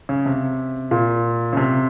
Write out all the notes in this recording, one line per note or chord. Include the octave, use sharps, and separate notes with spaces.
C#3
C3
A#2
C#3
C3